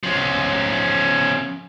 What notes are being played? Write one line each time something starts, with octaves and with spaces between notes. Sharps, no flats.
F3 C#4